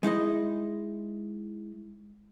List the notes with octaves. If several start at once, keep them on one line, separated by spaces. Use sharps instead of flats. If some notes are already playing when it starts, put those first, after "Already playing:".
G#3 D#4 E4 D#5